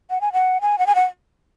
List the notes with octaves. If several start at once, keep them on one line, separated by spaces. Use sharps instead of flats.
F#5
G#5
F#5
G#5
F#5
G#5
F#5